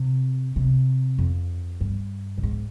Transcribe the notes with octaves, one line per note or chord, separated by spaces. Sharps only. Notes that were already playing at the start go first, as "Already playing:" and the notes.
Already playing: C3
C3
F2
G2
A#2
G#2